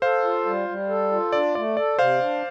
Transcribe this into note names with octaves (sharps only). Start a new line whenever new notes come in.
A4 C5 F5
F4
G3
G3
A4
F4
D4 D5
A3 D5
A4 D5
C3 C5 F5
D4